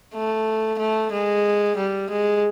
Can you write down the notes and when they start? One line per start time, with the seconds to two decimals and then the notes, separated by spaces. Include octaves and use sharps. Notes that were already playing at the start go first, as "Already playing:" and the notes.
0.14 A3
0.79 A3
1.12 G#3
1.77 G3
2.10 G#3